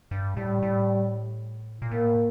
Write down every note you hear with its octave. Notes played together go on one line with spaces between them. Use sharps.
G2
A2 G3
A2
A#2
A2 A#3